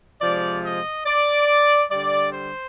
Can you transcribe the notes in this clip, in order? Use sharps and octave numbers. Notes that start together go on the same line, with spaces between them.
C3 F3 G#3 D5
D#5
D5
D3 G3 D5
C5